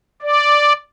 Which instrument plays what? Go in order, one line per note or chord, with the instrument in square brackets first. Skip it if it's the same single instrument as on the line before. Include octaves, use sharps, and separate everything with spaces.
[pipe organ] D5